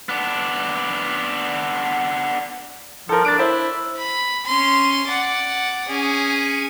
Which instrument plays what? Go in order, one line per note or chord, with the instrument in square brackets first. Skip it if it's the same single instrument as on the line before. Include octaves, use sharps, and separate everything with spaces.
[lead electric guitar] B3 D4
[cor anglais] F3 [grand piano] A4 A#4
[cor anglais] D4 [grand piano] A6 D7
[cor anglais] E4 [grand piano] C5 E5
[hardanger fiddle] B5
C#4 C6
D5 F#5
C#4 G#4